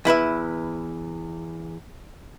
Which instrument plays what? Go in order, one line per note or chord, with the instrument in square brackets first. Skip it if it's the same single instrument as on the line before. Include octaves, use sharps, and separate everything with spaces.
[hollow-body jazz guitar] E2 E4 B4 E5